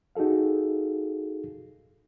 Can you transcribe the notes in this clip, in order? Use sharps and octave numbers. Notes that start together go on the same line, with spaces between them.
D#4 F#4 G#4 A4 F5